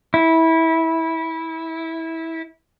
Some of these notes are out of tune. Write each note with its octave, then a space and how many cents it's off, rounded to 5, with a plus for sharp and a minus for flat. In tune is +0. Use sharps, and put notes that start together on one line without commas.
E4 -20